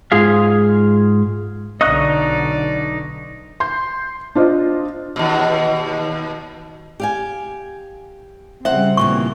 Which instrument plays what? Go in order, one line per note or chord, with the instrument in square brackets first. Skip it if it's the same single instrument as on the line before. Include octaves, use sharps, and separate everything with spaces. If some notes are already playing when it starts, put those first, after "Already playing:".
[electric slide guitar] G#2 F4 G#4 F5
[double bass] B1 D3 [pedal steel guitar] D#4 C#6 F#6 [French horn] D5 [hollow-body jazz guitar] D#5
[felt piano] C6 G6
D4 F4 C5 D#5
[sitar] D#2 B2
[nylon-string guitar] G4 F5 G#5
[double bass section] C#3 G3 C4 [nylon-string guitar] C5 F#5 [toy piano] E5
[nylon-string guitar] D#2 A#2 E3 [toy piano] C#6